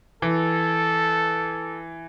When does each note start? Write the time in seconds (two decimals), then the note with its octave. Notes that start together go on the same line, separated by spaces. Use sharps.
0.22 E3 A4